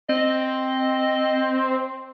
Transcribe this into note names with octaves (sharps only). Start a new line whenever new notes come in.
C4 D#5